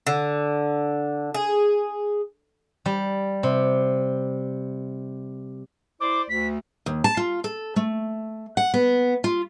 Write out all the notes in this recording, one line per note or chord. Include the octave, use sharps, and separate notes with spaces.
D3
G#4
G3
C3
E4 C5 D5 D6
D2 B6
D#2
A5
F4
A4
A3
F#5
B3
F4